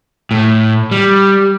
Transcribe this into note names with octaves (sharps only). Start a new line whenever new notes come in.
A2
G3